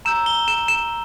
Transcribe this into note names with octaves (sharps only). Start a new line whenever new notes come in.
A#5 E6 G6 E7
G7
E7
E7